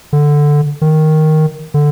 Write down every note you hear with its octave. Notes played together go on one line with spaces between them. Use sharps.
D3
D#3
D3